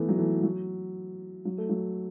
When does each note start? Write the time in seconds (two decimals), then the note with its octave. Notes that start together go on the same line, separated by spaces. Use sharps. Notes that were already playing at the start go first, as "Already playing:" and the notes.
Already playing: E3 A3 B3
0.09 F#3
0.18 E3 A3
0.43 F#3
1.45 F#3
1.58 A3
1.69 F#3